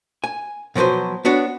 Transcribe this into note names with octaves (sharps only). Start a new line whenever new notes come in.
G#5
B2 F3 F#3 B4 C5
B3 D4 F#4 C#5